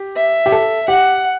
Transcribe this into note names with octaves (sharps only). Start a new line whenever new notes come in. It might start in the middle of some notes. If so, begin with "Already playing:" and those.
Already playing: G4
E5
G4
A4
G4 F#5